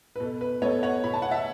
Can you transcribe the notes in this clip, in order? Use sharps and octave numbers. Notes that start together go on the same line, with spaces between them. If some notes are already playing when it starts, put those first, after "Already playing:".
B4
B2 A4
B4
B3 A4 C#5
C#5 F#5
B2 B5
A5
F#5
E5 A5